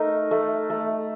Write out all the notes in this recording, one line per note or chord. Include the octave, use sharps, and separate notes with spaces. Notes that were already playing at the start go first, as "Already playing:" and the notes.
Already playing: A3 D#4 A#4
A3
A3